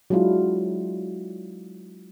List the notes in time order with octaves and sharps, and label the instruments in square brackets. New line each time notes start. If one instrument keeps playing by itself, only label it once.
[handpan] F#3 G#3 D4 E4 F4